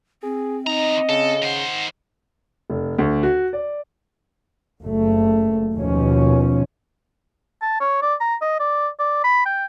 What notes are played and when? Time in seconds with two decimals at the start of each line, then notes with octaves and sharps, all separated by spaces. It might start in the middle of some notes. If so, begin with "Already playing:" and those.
0.23 C4 G#4
0.67 E2 D#4 D#5 A#5
1.09 C#3 A4
1.42 D#3 C5 F#5
2.70 F1
2.99 D2
3.23 F#4
3.53 D5
4.83 F#1 A3
5.76 D#2 B2 F3 C#4
7.62 A5
7.80 C#5
8.02 D5
8.20 A#5
8.41 D#5
8.60 D5
8.99 D5
9.24 B5
9.45 G5